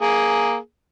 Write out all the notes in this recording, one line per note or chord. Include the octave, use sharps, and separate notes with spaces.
A#3 G#4